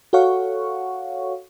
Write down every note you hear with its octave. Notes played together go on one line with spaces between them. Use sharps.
F#4 A4 C#5 F5 F#5 C#6